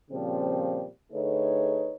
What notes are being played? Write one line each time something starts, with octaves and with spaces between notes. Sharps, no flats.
A#2 C#3 F3 G3 C4
D3 A3 D#4 G#4 B4 C#5